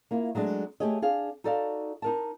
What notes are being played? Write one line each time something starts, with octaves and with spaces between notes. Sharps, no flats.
A#3 E4 F4
F#3 G#3 A3 D4
A3 G4 G#4 C#5 D#5
D4 G#4 F5
D#4 F#4 A4 D5 D#5 F5
D#4 A#4 A5